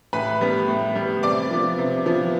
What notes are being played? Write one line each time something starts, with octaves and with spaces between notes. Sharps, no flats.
A2 B4 B5
G3 B3
A2
G3 B3
C3 D5 D6
F3 B3
C3
F3 B3